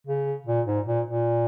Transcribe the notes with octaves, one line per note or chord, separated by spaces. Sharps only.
C#3
A#2
G#2
A#2
A#2